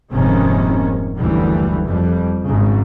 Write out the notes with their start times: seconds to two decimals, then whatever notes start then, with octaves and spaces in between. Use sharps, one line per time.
0.13 F1 D#2 G#2 C3 D#3 C#4
1.17 F#1 D2 E3 G3
1.85 F2 G3
2.45 G#1 G#2 C#3